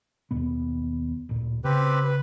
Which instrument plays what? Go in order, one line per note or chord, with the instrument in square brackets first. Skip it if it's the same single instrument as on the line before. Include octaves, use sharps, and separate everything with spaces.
[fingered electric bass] D#2 B2 B3
D1 A#2
[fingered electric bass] C#3 [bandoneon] C4 G4 B4
[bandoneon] B4